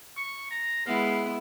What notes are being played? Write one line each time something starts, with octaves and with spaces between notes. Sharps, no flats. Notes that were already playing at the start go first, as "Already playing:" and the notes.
C#6
A#5
G#3 B3 E4 F5